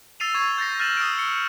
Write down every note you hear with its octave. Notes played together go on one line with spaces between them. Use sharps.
E6 A6 C7 D#7 F7
C#6 G#6
G6 A6 A#6 C7
F6 G6 A6 D#7 E7 F#7
D#6 E6 D7
E6 C#7